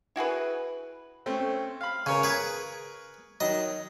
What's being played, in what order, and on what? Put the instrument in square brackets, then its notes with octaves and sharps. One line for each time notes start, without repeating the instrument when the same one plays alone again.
[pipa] E4 F#4 G#4 B4
[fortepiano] A3 C4 C#4
F5 B5
[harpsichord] C#3 [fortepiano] A#4 C#5 G#5
[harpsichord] G#4 B4
[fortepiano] D#3 F#3 [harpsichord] D#5